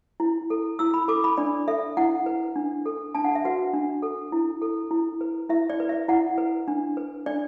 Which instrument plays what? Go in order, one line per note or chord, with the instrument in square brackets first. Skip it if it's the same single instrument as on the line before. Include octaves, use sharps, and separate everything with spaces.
[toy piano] E4
A4
E4 E6
B5
A4 D6
B5
D4 D5
A4 E5
E4 F#5
B4
D4
A4
D4 A5
F#5
E5
F#4 B4 F#5
D4
A4
E4
A4
E4
B4
E4 E5
D5
B4
E5
E4 F#5
B4
D4
B4
D4 D5